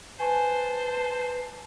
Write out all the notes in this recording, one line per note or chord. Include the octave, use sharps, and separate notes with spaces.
B4 C5 G#5 A5 C#6